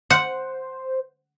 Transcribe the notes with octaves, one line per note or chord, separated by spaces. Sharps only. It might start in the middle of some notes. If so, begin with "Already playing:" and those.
C5 F#5